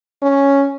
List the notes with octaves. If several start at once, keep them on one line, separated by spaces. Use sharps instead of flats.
C#4